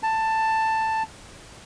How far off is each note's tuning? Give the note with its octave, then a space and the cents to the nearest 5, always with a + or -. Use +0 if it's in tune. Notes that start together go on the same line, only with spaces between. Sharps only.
A5 +10